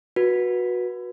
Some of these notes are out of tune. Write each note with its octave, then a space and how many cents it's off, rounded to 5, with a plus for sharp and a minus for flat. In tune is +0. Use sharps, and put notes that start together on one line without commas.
F#4 -15 B4 -25